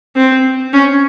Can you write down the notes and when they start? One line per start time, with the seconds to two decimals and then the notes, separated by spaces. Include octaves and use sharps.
0.16 C4
0.73 C#4